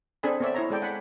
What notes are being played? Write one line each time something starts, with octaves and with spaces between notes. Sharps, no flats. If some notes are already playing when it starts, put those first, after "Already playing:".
C4 D4 G#4 A4 G#5 B5
B3 C4 C#5 D5 E5
E4 C#5 A#5
G#3 A4 D5 G5
F#5 G#5 B5